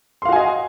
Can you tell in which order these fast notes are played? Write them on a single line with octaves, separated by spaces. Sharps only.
C6 F5 F#4 G#5 D#5